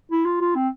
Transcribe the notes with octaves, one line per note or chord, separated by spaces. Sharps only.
E4
F4
F4
C4